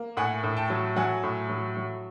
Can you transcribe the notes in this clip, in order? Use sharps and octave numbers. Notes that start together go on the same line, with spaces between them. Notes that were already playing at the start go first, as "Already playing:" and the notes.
Already playing: A#3
A2 F#5 G#5
A2
G5 A5
F#3
F#3 F#5 G#5
A2
F#3
F#3